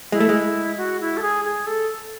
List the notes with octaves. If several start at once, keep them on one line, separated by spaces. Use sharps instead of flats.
G#3 E4
A3
G#3
F#4
E4
A4
G#4
G#4
A4